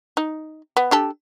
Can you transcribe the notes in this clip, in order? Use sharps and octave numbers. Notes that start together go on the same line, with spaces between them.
D#4
B3
D4 G4 A4